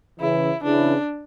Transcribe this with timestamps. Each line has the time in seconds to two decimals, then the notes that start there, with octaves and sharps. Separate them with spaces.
0.20 C#3 E3 E4
0.63 C#3 E3 D4